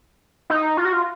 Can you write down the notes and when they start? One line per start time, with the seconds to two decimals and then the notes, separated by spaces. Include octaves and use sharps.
0.50 D#4
0.77 F4
0.85 F#4
0.93 F4